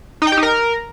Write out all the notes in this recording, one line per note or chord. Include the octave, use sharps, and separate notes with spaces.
D#4
G5
G4
D#4
A#4